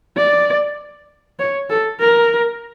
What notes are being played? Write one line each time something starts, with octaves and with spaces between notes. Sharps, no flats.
D5
C#5
A4
A#4